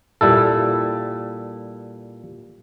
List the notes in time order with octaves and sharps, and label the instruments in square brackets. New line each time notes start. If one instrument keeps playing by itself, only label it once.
[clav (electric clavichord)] A#2 G3 E4 A4